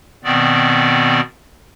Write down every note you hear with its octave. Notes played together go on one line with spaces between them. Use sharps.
B2 D#3 B3 C4 D5